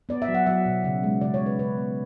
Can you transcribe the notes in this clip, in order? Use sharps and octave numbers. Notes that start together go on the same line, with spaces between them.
B3 D5
E5
F#3
F#5
F#3 E5
B2
C#3
G#3
C#3 D5
C#5
G#3
B4
C#3 B4
B3